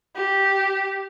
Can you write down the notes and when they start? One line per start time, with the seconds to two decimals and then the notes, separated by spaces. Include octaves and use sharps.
0.16 G4